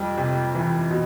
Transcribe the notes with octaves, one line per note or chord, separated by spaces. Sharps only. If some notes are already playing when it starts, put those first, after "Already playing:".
Already playing: F2 G3
C3
E3
B2